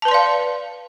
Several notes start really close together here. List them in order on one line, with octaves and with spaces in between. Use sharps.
A5 B4 C6 D5 F5